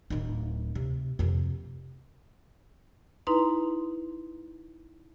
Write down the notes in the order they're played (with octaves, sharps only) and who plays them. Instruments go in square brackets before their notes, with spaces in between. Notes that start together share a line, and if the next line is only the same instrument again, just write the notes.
[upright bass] D1 D#4
C3
F2 C3
[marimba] D#4 E4 B4 A#5 C6